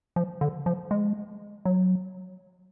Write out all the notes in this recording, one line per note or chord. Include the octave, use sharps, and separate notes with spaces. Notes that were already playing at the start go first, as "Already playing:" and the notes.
F3
D3
F3
G#3
F#3